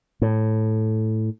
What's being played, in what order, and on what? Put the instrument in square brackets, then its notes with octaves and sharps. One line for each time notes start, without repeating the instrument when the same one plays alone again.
[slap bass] A2